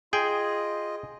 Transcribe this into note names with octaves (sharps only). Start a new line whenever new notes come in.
F4 G#4 D#5 G5